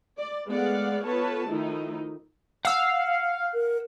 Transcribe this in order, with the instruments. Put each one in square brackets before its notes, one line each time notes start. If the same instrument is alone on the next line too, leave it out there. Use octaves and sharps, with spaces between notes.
[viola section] D5
G#3 A3 B3 D5 F5 F#5
B3 F4 A4 B4 C#5 A5
D#3 F3 A3 D#4 E4
[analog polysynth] F5 [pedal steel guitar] F#5 E6
[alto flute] A#4